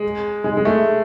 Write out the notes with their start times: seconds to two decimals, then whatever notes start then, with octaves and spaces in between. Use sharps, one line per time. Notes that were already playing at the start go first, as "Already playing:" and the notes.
Already playing: G#3
0.44 G#3
0.57 G#3
0.65 A3